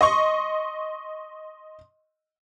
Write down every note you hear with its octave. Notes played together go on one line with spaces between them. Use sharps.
D#5 C6 C#6